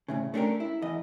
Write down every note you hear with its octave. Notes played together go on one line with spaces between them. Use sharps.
C2 A2 C#3
A3 C#4 D4 G4 G#4 A#4
E4
E2 D#5